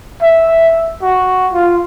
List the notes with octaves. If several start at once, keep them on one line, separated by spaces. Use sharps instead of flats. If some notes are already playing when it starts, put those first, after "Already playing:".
E5
F#4
F4